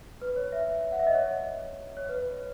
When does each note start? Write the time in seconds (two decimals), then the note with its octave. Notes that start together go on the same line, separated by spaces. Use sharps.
0.22 B4
0.36 C#5
0.52 E5
0.92 F#5
0.99 E5
1.07 D#5
1.14 C#5
1.97 C#5
2.09 B4